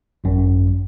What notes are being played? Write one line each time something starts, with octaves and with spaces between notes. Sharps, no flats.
G#1 F#2